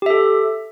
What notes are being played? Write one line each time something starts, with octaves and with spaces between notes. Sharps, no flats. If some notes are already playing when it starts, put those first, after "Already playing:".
G4 A4 E5